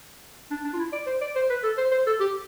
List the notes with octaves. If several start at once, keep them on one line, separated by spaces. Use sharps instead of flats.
D4
D4
F4
E4
D5
C5
D5
C5
B4
A4
C5
C5
A4
G4